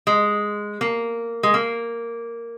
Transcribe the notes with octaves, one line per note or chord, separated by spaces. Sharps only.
G#3
A#3
G#3
A#3